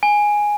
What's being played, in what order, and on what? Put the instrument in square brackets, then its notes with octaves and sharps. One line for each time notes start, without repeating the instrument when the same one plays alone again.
[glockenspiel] G#5